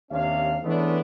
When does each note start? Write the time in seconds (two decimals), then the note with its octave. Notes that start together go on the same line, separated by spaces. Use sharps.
0.11 D#2 C3 C#4 D4 F5
0.63 E3 G#3 A3 B3 C#4 D4